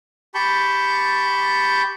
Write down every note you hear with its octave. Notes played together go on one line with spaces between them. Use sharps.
G4 A5 B5 C#6 G6